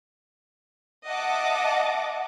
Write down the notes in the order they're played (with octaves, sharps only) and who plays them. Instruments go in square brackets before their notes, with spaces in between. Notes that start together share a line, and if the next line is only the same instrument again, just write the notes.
[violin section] D#5 E5 F#5 A5 D6